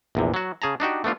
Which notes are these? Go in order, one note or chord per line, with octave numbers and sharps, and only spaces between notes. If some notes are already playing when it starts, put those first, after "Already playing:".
A#1 E2 C3
F#3 F#4
C#3 G#4 A5 A#5
D4 D#4 F#4 G4
A3 B3 D4 F4